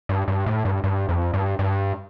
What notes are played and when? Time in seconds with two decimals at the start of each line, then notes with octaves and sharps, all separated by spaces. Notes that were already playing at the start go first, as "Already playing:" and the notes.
0.09 G2
0.28 G2
0.46 A2
0.65 G2
0.84 G2
1.09 F2
1.34 G2
1.59 G2